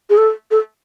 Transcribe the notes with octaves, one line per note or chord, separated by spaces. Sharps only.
G#4
A4
A4